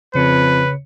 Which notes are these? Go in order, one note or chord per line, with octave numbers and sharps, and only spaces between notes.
F2 C#3 B4 C#5 C#7